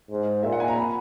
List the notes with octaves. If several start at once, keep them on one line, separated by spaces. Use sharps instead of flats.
G#2
A#2 E5
F#5
G#5
A#5
B5